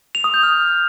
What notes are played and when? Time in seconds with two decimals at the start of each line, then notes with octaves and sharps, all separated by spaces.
0.15 F7
0.24 D#6
0.34 G6
0.43 F6